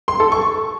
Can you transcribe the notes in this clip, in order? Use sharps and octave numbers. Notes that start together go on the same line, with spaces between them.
C6
A4
C#6